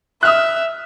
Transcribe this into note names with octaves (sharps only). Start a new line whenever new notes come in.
E5 D#6 F6 F#6